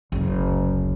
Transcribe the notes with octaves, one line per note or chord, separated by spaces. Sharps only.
F#1 D2